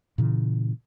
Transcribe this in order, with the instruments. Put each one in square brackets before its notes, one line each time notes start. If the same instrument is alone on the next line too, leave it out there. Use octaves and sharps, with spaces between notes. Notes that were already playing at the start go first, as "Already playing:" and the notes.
[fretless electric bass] A#2 C#3 E3